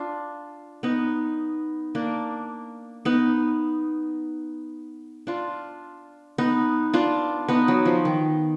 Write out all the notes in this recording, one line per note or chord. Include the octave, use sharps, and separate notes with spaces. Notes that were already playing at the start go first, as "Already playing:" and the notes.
Already playing: D4 F4
B3 D#4
A#3 D4
B3 D#4
D4 F4
B3 D#4
D4 F4
B3 D#4
F#3
F3
D#3